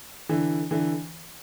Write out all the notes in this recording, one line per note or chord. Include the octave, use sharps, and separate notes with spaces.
D3 E3
D3 E3